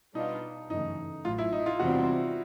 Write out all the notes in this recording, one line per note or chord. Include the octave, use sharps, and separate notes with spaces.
B2 G3 B3 D4 D#4 F4
G1 F#2 C#3 E3 A3 D#4
A1 A2 F#3 F4
E4
D#4
F4
E2 C3 E3 G3 C4 F#4